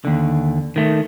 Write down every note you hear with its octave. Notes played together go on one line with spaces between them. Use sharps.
D#2 D3
D#3 A3